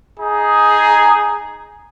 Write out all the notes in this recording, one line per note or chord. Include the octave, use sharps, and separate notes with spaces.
D#4 G#4